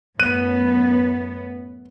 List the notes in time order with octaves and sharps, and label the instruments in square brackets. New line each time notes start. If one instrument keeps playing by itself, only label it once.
[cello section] F#2 A2 B3 [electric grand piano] F#6 D#7